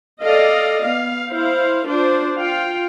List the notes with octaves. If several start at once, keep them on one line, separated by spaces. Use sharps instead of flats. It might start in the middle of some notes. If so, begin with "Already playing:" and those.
A4 D5 D#5 F5
B3 F5
E4 C5 F5
D4 F4 C5
F4 F5 G5